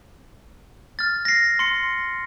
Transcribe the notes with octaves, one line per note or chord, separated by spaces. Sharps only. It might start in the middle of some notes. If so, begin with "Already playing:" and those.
F6 A6
A#6 C7
C6 C#7